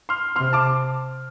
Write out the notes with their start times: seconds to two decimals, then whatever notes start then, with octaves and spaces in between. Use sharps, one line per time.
0.09 C6 F6
0.36 C3 C6 F6
0.53 A5 D6